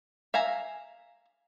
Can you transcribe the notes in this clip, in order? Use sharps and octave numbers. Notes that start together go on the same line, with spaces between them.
E5 F5 G#5 A#5